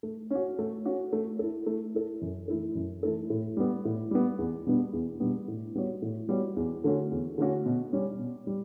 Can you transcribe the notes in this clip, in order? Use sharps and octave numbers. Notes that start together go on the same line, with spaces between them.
A3
C#4 F#4
A3
C#4 F#4
A3
E4 A4
A3
E4 A4
F#2
E3 A3 E4 A4
F#2
E3 A3 E4 A4
A2
G3 B3
A2
G3 B3
E2
B2 G3 B3 D4
E2
B2 G3 B3 D4
A2
G3 B3 F#4 C#5
A2
G3 B3 F#4 C#5
E2
D3 A3 C#4 F#4
E2
D3 A3 C#4 F#4
B2
G3 C#4
B2
G3